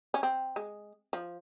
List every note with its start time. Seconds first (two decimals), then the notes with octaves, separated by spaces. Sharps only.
0.14 C#4
0.23 C4
0.56 G#3
1.13 F3